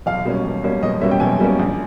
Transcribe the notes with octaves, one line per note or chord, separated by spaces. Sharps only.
B1 F5
B2 G3 A#3 C#4
B1
B2 G3 A#3 C#4
B1 D#5
B2 G3 A#3 C#4 E5
G5
B1 G#5
B2 G3 A#3 C#4
A#1